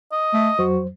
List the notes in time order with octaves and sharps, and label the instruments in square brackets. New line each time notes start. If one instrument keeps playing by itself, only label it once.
[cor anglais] D#5
[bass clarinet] A3
[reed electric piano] F2 F#3 C5 [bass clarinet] F#4